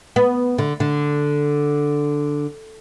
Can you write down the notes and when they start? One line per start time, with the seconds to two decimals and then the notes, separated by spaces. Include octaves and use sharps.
0.16 B3
0.58 D3
0.80 D3